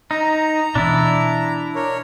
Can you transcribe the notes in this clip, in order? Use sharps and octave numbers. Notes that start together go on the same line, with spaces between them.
D#4 A#5
B2 E3 D4 E4
A#4 C#5